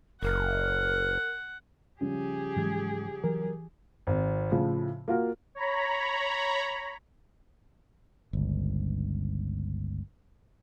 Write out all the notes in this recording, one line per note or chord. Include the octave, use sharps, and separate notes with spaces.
F#1 A#4 F#5
C#3 F3 G3 G4 G#4
G#2 E3 F#3 G#3 G#6
E3 F#3 A#4
G#1
A2 C#3 F3
A#3 F4 F#4 A#4
C#5 A#5 B5
G1 C#2